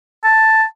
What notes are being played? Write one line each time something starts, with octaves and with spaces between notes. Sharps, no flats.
A5